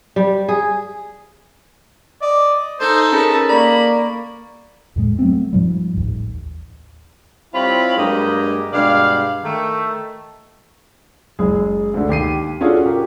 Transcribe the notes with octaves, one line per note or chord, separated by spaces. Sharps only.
G3
G#4
D5 D#5
D#4 A4 C5
C#4 G#4 A#4 B4 A5
A#3 D5 A#5 B5 C#6
E2 A2 G#3
F#3 A3 B3 C4
G#2 F3 G3
A1 D#2
G3 C4 E4 F4 C#5 B5
G2 F#3 G#3 A#3 G4 D#5
G2 B2 G#3 D5 F5
D#3 A3
F#1 G#3 G#4
D2 D3
D#2 G4 C7 D#7
C#4 D4 F4 F#4 G#4 A4
G4 A#4